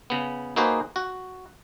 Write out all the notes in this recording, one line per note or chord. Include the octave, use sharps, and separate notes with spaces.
C#3 B3
A#3 D#4 F#4 G#4 B4 C5
F#4